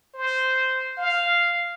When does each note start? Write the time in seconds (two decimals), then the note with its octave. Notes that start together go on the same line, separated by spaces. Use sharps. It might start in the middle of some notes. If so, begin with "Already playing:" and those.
0.14 C5
0.98 F5